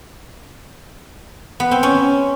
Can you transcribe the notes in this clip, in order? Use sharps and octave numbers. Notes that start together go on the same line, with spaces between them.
B3
C4
C#4